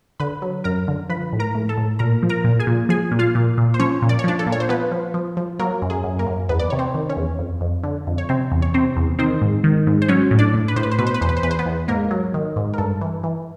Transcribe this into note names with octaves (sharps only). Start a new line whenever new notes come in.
D3 B4 B5
F#3
F#2 A#4 A#5
D3
F3 B4 B5
A2
A#4 A#5
A2
A4 A5
A2
A#2 A#4 A#5
F3
A#4 A#5
A#2
G#4 G#5
A#2
F3 G#4 G#5
A#2
F4 F5
A#2
A#2
C5
F3 C#4 C#5
A#2
D5
C#5
F3 D4 D5
A4
A#2
C#5
C5
F3 B3 B4
F3
F3
F3
F#3 A#3 A#4
F#2
G#4
F#2
A#3 A#4
F#2
E2 B3 B4
D5
C3 C#5
C4 C5
D#3
C#4 C#5
E2
F2
F2
D3
F2
C#5
C3 C4 C5
E2
C#5
C3 C4 C5
E2
D#3 C4 C5
G#2
D#3
G#2
C5
F#3 C#4 C#5
A2
D4 D5
A2
B4
A2 C5
B4
C5
B2 B4
C5
B4
E2 C5
B4
C5
E2 B4
C5
B3 B4
E2
G#2 A#3 A#4
F#3
D#3
G#2
A#4
G2 A4
E3
E3